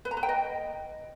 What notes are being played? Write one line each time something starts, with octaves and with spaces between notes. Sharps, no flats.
B4
A#5
B4
G5
D#5